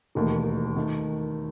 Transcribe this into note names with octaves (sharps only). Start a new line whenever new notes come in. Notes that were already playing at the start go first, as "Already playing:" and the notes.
E1 D#2 D#3 A3
D#3 A3